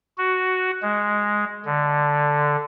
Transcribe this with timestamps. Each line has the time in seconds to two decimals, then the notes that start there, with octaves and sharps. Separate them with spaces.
0.18 F#4
0.82 G#3
1.66 D3